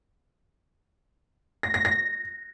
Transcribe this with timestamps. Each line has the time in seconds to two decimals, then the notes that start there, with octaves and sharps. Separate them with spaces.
1.63 A#6
1.74 A#6
1.85 A#6